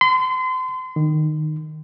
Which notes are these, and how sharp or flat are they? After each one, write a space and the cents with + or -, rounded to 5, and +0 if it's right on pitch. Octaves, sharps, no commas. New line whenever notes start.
C6 -35
D#3 -20